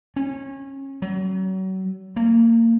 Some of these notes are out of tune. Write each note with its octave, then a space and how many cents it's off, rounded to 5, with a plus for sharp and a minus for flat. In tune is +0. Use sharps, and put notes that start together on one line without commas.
C#4 -25
F#3 +35
A#3 -25